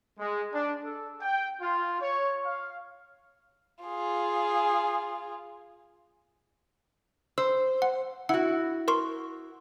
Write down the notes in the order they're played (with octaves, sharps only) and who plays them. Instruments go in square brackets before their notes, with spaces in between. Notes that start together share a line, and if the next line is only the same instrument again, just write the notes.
[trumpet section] G#3
D4
A4
G5
F4
C#5
F5
[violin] F4 G#4
[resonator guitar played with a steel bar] C5 [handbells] E6
[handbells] F#5
[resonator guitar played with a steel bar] E4 F#4 [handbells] F#5
[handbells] A#4 C6 C#6